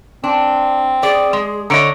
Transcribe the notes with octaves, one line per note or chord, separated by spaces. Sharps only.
C4 D4
G#4 D5
G#3 C6
D3 C#5 D#5 A#5 C#7 D7